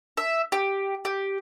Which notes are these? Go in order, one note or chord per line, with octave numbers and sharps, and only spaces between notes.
E5
G4
G4